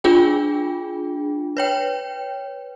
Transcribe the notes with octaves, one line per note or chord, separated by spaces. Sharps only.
D4 F4 G#4 G5
B4 C#5 G5